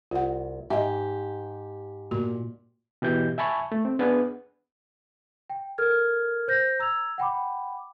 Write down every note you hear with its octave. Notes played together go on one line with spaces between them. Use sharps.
C2 F4 F#5
G#2 G4 D#5 E5
A#2 F#4
B2 E3 G4 G6
E5 G#5 A5 B5 C#6
A3
C4
B3 D4 G#4 B4
G5
A4 A#4 F6 G#6
C5 G6 A#6
A#5 E6 G#6 F7
F#5 G5 B5 D6